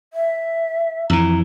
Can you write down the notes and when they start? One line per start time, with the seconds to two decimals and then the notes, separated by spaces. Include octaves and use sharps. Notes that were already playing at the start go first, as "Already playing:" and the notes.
0.13 E5
1.10 F2 E3 A#5